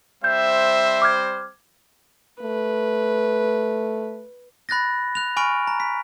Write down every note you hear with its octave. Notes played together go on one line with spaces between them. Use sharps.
G3 C4 C5 E5 G6
D6 F6 G#6
A3 B4
B5 F#6 A6 A#6
F#6 F7
G#5 B5 C#6 F6 D7
A#5
B6